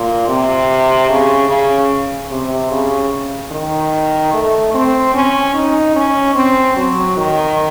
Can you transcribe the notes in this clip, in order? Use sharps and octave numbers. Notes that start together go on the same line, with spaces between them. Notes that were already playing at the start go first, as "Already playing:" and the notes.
Already playing: A#2
C3
C#3
C#3
C3
C#3
D#3
A3
C4
C#4
D#4
C#4
C4
F#3
D#3